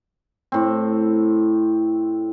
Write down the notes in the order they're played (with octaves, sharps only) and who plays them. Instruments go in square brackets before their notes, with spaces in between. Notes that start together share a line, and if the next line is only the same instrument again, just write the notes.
[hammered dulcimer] A2 C4